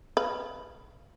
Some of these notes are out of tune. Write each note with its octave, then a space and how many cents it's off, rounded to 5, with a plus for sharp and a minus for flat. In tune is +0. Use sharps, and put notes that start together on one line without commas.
B4 +0 F5 -15